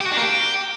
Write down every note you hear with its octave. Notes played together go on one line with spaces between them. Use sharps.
G4
F#4
D4
A#3
G4